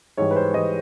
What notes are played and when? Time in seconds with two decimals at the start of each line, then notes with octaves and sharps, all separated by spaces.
0.17 G#2 E3 G3 C#5
0.31 B4
0.36 C5
0.54 G#2 E3 G3 D#5